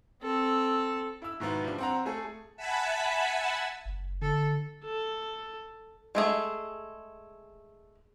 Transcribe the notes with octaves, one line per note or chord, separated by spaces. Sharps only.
C4 A4
E4 E6
G#2 B2 D#3 B3 E4
F3 G3 D4
C4 F#5 A#5
A3 G#4 A4
E5 F#5 G#5 A5 B5 E6
F#1
D3 A4
A4
G#3 A3 G#4